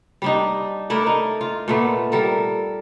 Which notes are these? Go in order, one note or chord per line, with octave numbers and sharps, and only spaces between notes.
G3 D4 D#4
A3 D4 E4 A#4
D#4
F4
A#2 A3 B3
G3 A4 A#4